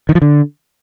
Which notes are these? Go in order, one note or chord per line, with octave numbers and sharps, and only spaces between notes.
D#3
F3
D3